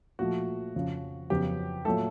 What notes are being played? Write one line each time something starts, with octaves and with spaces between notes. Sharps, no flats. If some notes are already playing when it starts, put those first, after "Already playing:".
A#2 F3 A3 F#4
F2 C#3 F3
F2 C#3 F#3 B3 G4
A#2 F#3 A3 A4